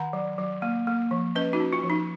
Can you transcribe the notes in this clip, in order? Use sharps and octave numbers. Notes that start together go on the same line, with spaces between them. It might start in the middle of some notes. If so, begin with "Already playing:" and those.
Already playing: D#3 F#5 A#5
F#3
F#3
A#3
A#3
F3
C#4 B4 D#5
D#4 F#4
C#4
F4
F3
D#4